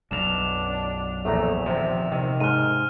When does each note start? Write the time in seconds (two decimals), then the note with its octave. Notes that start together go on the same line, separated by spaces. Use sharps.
0.11 B1 F#2 D4 E7 F7
1.25 A#1 E2 A3 A#5
1.66 C3 D#3 F3
2.11 C3 D#3
2.40 G#2 F6 D#7